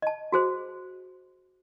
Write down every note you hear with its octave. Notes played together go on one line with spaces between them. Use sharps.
D#5 A5
F#4 G#4 C5